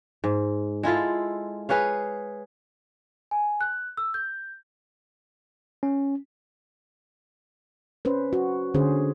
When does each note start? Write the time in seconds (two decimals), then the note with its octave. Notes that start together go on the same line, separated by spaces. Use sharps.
0.24 G#2
0.83 G#3 E4 F4 A4
1.69 G#4 B4 C#5 F5
3.31 G#5
3.61 F#6
3.97 E6
4.14 G6
5.83 C#4
8.05 C#4 B4 C5
8.33 F#4
8.74 D3 C#4 G#4 C5